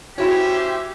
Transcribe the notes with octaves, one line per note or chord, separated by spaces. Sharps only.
C#4 E4 F#4 G4 C5 C#5 E5 G#6